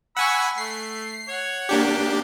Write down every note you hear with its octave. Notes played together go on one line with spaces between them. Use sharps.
F#5 G#5 B5 C#6 E6
A3 C7
C#5 F#5
A#3 D4 G4